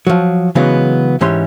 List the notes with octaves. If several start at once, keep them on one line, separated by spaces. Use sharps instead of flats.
F3 F#3
C#3 E3 F#3 G#3 B3
G#2 E3 C#4 G4 C6